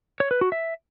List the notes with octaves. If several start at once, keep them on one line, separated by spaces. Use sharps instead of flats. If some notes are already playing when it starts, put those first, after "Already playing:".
C#5
B4
F#4
E5